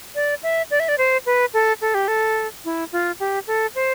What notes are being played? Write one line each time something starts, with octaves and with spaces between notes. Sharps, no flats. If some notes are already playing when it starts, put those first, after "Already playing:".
D5
E5
D5
E5
D5
C5
B4
A4
A4
G4
A4
E4
F4
G4
A4
C5